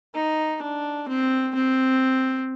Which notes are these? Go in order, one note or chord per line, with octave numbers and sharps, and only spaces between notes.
D#4
D4
C4
C4